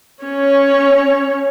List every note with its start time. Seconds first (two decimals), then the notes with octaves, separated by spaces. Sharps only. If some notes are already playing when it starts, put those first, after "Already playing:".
0.24 C#4 C#5